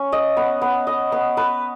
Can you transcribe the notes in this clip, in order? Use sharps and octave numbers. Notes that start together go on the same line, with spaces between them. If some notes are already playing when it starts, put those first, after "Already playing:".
Already playing: C#4
D#5
B3
B3
D#5
B3
B4